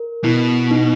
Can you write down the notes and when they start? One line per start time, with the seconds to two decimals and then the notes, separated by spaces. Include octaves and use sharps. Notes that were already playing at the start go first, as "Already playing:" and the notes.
Already playing: A#4
0.24 B2 E4
0.71 D#4